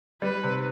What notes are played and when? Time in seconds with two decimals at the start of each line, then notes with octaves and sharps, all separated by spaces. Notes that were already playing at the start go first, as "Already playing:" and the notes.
0.22 G3 B4
0.43 C3